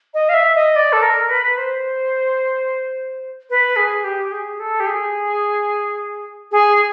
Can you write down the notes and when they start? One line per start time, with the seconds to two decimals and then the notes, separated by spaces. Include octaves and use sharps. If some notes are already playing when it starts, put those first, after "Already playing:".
0.14 D#5
0.29 F5
0.34 E5
0.55 D#5
0.75 D5
0.92 A4
1.02 A#4
1.29 B4
1.57 C5
3.50 B4
3.76 G#4
4.04 G4
4.32 G#4
4.59 A4
4.80 G4
4.86 G#4
6.51 G#4